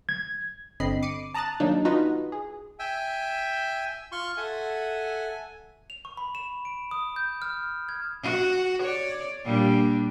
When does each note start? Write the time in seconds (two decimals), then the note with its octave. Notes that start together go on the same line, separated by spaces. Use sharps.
0.09 G#6
0.80 G1 D3 C4 D#5 B5 C7
1.03 D6 C7 C#7 D#7
1.34 A5 A#5 D#6 F#6 A6
1.60 D#3 F#3 A#3 D4 D#4
1.85 D#4 F4 F#4 B4 D#5
2.32 G#4
2.79 E5 G5 G#5 E6
4.12 F4 C6 C#6
4.37 A4 E5 F#5 G#5
5.90 F7
6.05 C#6
6.17 B5
6.35 E7
6.65 D7
6.91 D#6
7.16 G6
7.42 F6
7.89 G#6
8.23 F#4
8.82 C#5 D5
9.45 A#2 G3 D4